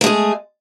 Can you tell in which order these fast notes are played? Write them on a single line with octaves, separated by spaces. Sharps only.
A3 G#3 G#4